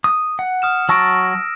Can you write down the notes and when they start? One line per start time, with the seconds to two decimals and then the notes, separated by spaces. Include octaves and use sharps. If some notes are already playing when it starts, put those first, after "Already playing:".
0.04 D#6
0.39 F#5
0.62 D#6 F6 E7
0.89 F#3 A5 C#6 E6 A#6 D7